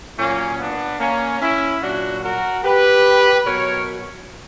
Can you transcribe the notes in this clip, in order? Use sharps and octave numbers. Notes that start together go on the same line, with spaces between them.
A#2 F#3 A#3 C#4
B3 D4
A#3 C#4
C#4 E4
A#2 F#3 D4 F#4
F#4 A#4
G4 B4
B2 F#3 A#4 C#5